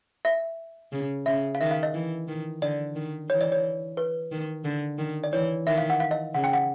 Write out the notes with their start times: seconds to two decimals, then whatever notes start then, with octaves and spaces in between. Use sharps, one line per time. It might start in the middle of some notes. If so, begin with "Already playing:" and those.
0.25 E5
0.92 C#3
1.26 C#3 E5
1.55 F5
1.61 D#3 E5
1.71 F5
1.83 D#5
1.94 E3
2.28 D#3
2.62 D3 D5
2.95 D#3
3.30 E3 C#5
3.41 D5
3.52 C#5
3.97 B4
4.32 D#3
4.65 D3
4.98 D#3
5.24 D5
5.32 E3 C#5
5.67 D#3 E5
5.78 F5
5.90 F#5
6.00 F5
6.11 D#5
6.34 C#3 F#5
6.44 G5
6.53 F#5